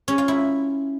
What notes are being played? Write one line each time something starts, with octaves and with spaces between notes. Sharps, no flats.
C#4
F4
E4